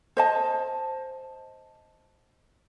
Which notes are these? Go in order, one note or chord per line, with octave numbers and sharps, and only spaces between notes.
C5 D#5 A5